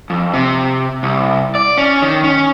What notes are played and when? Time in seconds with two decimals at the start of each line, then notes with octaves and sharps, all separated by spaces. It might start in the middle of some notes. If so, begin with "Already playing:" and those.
0.10 F2
0.34 C3
1.03 C2
1.55 D5
1.78 C#4
2.02 D#3
2.24 C#4